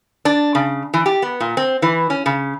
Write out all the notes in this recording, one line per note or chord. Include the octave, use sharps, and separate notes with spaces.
D4
C#3
E3
G4
B3
A#2
C4
E3
C#4
C#3